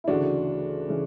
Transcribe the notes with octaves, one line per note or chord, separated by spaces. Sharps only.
E4
D2 C#3 E3 D4 F#4
C#3 E3